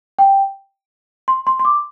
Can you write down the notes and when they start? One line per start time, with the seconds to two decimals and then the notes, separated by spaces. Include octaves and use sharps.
0.19 G5
1.28 C6
1.47 C6
1.59 C6
1.65 D6